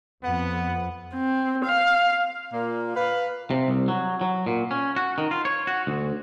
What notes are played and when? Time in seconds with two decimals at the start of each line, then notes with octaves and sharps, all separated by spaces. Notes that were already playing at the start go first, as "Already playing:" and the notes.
0.24 F2 B3 F#5
1.15 C4
1.65 F5
2.53 A#2 A#3
2.96 B4 F5
3.51 C3
3.68 C2
3.88 F#3
4.21 F#3
4.46 A#2
4.71 C#4
4.96 F#4
5.18 D#3
5.31 F4
5.45 C#5
5.67 F#4
5.87 D2